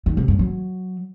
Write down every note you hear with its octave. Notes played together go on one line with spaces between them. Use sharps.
D#3
C3
G2
F#3